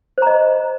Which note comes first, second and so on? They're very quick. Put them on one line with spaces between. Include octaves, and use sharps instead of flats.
C5 A#5 D#5